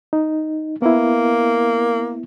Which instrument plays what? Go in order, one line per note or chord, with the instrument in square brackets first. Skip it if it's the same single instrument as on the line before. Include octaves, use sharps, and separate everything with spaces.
[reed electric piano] D#4
[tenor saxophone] A#3 [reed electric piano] B3 E4